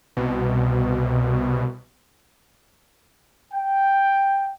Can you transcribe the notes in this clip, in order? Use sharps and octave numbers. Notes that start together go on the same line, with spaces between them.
C2 B2
G5